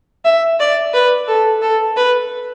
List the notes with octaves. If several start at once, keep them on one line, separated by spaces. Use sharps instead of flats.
E5
D5
B4
A4
A4
B4